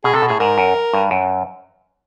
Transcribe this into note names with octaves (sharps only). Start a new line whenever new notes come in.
B2 G#4
C3 A4
B2
A2 G#4
G#2 A#4
F#2
G2
F#2